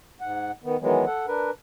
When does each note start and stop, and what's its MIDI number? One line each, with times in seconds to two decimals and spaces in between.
0.21 0.51 44
0.21 0.51 78
0.63 0.77 51
0.63 0.77 59
0.81 1.05 51
0.81 1.05 52
0.81 1.05 54
0.81 1.05 56
0.81 1.05 59
1.06 1.26 69
1.06 1.26 78
1.27 1.51 62
1.27 1.51 70
1.27 1.51 71